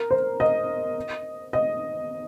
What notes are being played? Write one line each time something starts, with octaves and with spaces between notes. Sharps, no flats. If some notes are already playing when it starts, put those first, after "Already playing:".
Already playing: A#4
C5
D#5
D#5